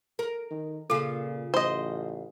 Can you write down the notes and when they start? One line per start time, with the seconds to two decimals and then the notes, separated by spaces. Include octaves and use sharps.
0.19 A#4
0.50 D#3
0.90 A#2 C#3 F4 A4
1.54 A1 C5 D#5